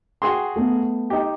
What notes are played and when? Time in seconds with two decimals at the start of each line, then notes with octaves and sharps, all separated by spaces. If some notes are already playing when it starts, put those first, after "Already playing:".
0.22 F#4 G#4 G5 C6
0.56 A3 B3
1.10 D#4 G4